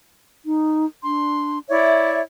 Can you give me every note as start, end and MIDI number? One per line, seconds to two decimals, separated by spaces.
0.45 0.85 63
1.03 1.58 62
1.03 1.60 84
1.69 2.21 64
1.69 2.21 73
1.69 2.21 74
1.69 2.21 76